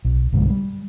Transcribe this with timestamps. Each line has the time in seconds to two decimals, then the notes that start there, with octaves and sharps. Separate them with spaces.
0.05 B1
0.32 B1 G2 D3 G#3
0.50 G3